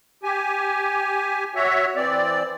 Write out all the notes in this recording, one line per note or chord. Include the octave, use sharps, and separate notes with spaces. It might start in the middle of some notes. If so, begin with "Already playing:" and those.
G4 G#5
F#4 C#5 E5
E3 C4 D5